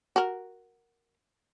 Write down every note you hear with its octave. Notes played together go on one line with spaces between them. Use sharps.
F#4 A#4